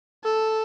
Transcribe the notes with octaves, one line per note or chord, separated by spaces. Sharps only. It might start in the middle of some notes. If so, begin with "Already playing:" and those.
A4